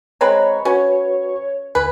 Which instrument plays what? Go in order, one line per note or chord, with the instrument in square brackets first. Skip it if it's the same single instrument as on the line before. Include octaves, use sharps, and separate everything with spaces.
[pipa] G#3 C4 B4 [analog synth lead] C#5 [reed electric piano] A#5 B5
[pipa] C#4 [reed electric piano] F#4 B4
[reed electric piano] D2 G#5 [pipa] B4